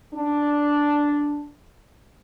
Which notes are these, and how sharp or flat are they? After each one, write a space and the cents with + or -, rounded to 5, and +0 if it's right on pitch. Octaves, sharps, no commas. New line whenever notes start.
D4 -5